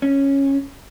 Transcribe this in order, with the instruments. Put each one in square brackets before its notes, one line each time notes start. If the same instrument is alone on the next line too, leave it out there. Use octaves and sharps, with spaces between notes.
[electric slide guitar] C#4